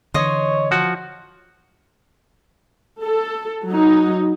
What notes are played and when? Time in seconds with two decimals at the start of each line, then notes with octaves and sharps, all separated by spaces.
0.14 D3 E3 C#5 D#5 C6
0.71 F3 F#4
3.03 A4
3.68 F#3 D#4